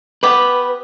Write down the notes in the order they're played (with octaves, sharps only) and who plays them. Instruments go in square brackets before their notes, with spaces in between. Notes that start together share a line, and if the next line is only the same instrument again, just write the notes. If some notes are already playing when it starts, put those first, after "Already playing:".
[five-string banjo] B3 G4 B5 [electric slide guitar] B4